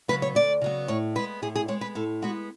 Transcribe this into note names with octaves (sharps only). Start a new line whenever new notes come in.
C#3 F#3 B3 B4
C#5
D2 D5
C#3 F#3 B3
A2 C#5
G#3 B3 B4
A2 G#4
G#4
G#3 B3 C#5
B4
A2 A4
G#3 B3 F#4